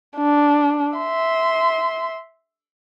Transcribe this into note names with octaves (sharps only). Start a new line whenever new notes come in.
D4
E5 C6